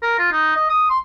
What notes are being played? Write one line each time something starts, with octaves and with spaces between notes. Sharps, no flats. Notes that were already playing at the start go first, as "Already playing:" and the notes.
A#4
F4
D#4
D#5
D#6
C6